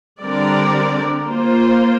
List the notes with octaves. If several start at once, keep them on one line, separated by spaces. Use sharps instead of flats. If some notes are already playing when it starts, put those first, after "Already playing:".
D3 G3 C4 A#4 D5
A#3 F4 C5